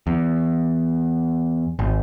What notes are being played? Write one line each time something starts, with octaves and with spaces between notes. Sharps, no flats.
E2
G#1